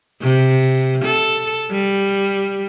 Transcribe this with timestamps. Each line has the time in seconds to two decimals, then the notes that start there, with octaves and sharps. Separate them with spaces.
0.21 C3
1.05 A4
1.71 G3